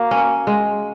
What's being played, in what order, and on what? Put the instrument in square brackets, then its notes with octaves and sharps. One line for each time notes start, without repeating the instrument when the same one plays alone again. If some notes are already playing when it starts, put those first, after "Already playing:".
Already playing: [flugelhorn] A#3 [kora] F#4
[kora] C#4
G#3